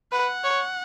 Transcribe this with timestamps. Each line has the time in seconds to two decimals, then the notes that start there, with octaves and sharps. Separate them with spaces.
0.12 B4 F#5
0.44 C#5